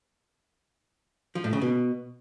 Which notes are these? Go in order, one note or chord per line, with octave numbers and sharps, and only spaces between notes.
F3
A2
C#3
B2